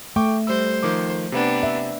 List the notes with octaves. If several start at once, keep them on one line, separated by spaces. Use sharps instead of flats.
A3 G5 C#6 D6
G3 C5 E6
D#3 F3 D6
C3 B3 D4 G5
E5